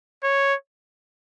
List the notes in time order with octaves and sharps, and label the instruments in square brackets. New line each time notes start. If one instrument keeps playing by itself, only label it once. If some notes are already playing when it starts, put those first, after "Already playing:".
[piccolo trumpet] C#5